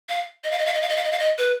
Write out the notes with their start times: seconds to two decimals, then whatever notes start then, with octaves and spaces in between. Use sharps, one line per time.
0.09 F5
0.44 D#5
0.51 F5
0.59 D#5
0.66 F5
0.74 D#5
0.82 F5
0.89 D#5
0.97 F5
1.04 D#5
1.12 F5
1.19 D#5
1.38 B4